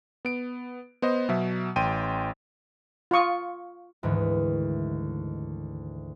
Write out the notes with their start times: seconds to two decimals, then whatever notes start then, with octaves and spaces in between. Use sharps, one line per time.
0.25 B3 D7
1.02 B3 C5 D#5
1.29 B2 F#3 E5
1.76 A1 G5 C6 D#7
3.11 F4 F5 C#6 D#6
4.03 D2 G#2 D#3 E3